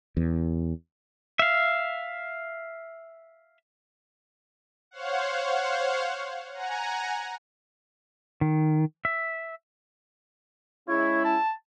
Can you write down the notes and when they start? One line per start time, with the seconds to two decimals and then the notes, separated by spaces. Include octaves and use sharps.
0.17 E2
1.39 E5 F5
4.91 C5 C#5 F5 F#5
6.54 F#5 G#5 A#5
8.41 D#3
9.05 E5
10.89 G#3 C#4 E4 C#5
11.25 A5